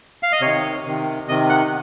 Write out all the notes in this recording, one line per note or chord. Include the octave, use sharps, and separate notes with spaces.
F5
D#5
C3 D#3 C#5
C3 D#3
C3 D#3 D#5
F#5